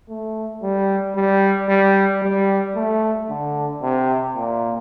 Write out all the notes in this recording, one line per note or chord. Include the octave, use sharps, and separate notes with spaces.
A3
G3
G3
G3
G3
A3
D3
C3
A#2